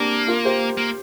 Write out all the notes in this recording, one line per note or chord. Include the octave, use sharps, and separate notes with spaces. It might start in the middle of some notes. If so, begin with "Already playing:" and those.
Already playing: A#3 C4 D4 G4 A#4
F4 A#4
G4 C5
A#3